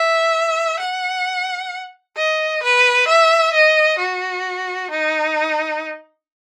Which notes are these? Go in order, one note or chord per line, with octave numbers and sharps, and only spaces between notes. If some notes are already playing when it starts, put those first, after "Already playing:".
Already playing: E5
F#5
D#5
B4
E5
D#5
F#4
D#4